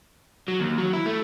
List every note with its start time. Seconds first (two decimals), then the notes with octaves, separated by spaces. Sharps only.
0.48 F#3
0.60 D#2
0.78 F#3
0.93 E4
1.06 A3